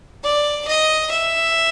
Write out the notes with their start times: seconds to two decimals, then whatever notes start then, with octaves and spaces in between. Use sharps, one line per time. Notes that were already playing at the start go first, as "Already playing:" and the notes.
0.23 D5
0.68 D#5
1.11 E5